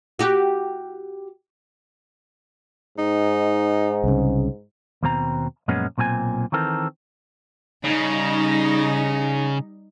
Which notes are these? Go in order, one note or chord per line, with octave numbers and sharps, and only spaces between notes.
F#4 G4
G#2 D#4
C2 C#3
D#2 B2 C4 A#5
F#2 A#2 F3 G#3 B3 C#4
B1 A#2 C4 G#4 G#5
D#3 E3 C4 A4 A#4
C#3 G3 D#4